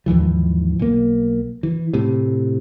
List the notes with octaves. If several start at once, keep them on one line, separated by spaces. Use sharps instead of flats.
D#2 G#2 E3 F3
B1 A#3
E3
A2 C3